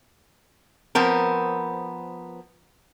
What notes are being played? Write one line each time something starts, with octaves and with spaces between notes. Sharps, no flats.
F3 B3 C4 A#4